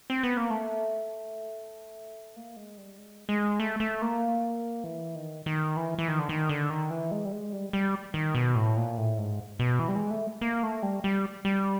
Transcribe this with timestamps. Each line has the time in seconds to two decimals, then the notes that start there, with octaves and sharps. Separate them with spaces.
0.10 C4
0.23 B3
0.37 A#3
0.50 A3
2.36 A#3
2.56 G#3
2.77 G3
2.98 G#3
3.29 G#3
3.60 A3
3.80 A3
4.02 A#3
4.84 E3
5.15 D#3
5.46 D#3
5.77 E3
5.99 E3
6.08 D#3
6.19 D3
6.29 D#3
6.49 D3
6.70 D#3
6.90 E3
7.11 G#3
7.25 G3
7.32 G#3
7.53 G3
7.73 G3
8.14 D#3
8.35 B2
8.55 A2
8.77 A#2
8.98 A2
9.18 G#2
9.59 B2
9.79 E3
9.88 G3
9.96 G#3
10.11 A3
10.41 A#3
10.63 A3
10.83 G3
11.04 G3
11.45 G3